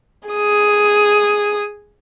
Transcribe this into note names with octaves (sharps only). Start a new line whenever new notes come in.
G#4 D#6